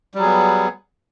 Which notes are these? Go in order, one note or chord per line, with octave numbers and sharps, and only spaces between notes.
F#3 G3 B3 G#4